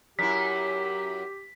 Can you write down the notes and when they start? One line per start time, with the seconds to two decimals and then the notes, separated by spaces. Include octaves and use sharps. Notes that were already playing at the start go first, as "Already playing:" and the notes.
0.19 F#2 E4 G4 B6